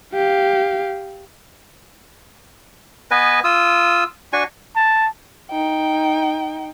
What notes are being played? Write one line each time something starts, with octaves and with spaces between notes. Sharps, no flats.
G4 F5
B3 B4 D#5 G#5
F4 D#6 E6
D4 F#4 G#5 C#6
A5
D#4 G5